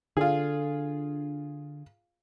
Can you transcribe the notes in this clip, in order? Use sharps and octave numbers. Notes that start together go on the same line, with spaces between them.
D3 F4 G#4